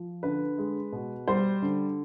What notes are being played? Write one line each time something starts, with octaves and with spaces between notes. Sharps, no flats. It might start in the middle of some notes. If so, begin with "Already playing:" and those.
Already playing: F3
D3 B4
G#3
B2
G3 C5
D3